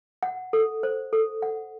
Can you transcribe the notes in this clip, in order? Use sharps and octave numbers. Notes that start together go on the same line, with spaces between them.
F#5
A4
C5
A4
F#5